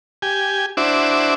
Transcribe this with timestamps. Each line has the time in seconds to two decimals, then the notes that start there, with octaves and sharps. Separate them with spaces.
0.22 G4 G#5
0.77 D4 E4 F#4 C5 E5 D6